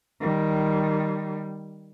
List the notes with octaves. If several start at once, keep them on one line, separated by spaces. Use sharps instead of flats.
D#3 G3